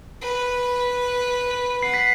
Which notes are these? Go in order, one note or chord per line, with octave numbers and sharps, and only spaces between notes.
B4
F#5 C7
B6